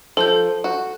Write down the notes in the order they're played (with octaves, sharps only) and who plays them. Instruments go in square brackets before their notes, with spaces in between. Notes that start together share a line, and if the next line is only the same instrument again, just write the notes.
[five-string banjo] F3 [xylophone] A4 G6
[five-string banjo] F#4